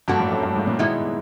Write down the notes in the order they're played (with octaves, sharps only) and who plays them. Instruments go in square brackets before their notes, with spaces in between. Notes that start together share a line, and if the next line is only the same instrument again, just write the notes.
[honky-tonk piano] G2 [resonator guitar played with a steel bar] F3 A#3 D4 F#4 A4
[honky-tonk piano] A2
F#2
G2
G#2
A#2
[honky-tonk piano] B2 [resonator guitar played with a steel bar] D#3 G#3 B3 E4